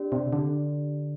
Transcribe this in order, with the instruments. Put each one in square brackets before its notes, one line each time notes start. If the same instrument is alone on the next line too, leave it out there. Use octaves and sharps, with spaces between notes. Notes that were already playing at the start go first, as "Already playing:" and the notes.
Already playing: [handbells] D4 G4 D5
[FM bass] C3
D3